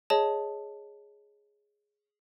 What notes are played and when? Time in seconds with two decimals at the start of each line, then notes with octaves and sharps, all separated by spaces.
0.10 G#4 C#5 D#5 A5